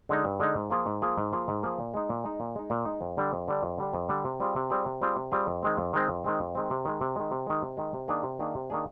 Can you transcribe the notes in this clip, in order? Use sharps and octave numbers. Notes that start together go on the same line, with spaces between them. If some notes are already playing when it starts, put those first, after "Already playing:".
D3 G#3 D#4
G2
D3 G#3 D#4
G#2
F3 A#3 F4 G#4
G#2
F3 A#3 F4 G#4
G#2
F3 A#3 F4 G#4
G#2
F3 A#3 F4 G#4
A#2
G#3 D#4
A#2
G#3 D#4
A#2
G#3 D#4
A#2
G#3 D#4
F2
D3 G3 D4
F2
D3 G3 D4
F2
D3 G3 D4
F2
D3 G3 D4
C3
G3 C4 F4 G#4
C3
G3 C4 F4 G#4
C3
G3 C4 F4 G#4
C3
G3 C4 F4 G#4
F2
D#3 G#3 C4
F2
D#3 G#3 C4
F2
D#3 G#3 C4
F2
D#3 G#3 C4
C3
D#3 G#3
C3
D#3 G#3
C3
D#3 G#3
C3
D#3 G#3
C3
D#3 A#3 D4 G#4
C3
D#3 A#3 D4 G#4
C3
D#3 A#3 D4 G#4